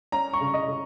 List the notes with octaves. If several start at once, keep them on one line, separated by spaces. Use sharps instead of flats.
C#4 A#5
C#6
C#3
D#5
C#3